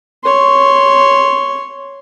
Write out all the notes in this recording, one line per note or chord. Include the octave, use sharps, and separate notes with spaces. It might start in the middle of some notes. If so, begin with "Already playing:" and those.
C#5 C6